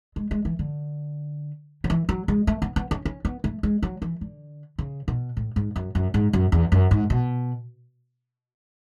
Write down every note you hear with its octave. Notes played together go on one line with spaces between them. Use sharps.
G#3
G#3
E3
D3
F#3
E3
F#3
G#3
A3
B3
B3
C#4
C#4
B3
A3
G#3
F#3
E3
D3
C#3
B2
A2
G#2
F#2
F#2
G#2
F#2
E2
F#2
G#2
B2